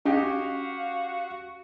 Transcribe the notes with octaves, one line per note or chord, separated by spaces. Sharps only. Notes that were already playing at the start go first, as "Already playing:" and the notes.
C#4 F#4 G4 D#5 F5 G#5